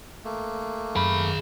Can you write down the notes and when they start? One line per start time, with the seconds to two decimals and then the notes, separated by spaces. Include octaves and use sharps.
0.25 A3 A#3
0.96 F#2 G#4 B5